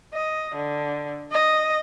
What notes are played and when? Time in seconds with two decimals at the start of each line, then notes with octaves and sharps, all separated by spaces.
0.14 D#5
0.55 D3
1.32 D#5